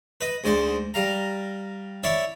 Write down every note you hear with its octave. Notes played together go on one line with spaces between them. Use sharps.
B4 D#5
D2 G#2 C5 D5
G3 F5 A#5
E4 C#5 D5 E5